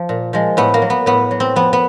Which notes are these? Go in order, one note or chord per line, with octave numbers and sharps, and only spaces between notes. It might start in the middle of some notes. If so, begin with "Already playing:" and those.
Already playing: F3
A#2
F3 G#3
A2 B3
A#3
F#3
B3
A2 B3
F#3
C4
F2 B3
B3